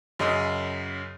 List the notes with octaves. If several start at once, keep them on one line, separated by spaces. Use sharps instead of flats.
F#2 C#3 D#5 D#6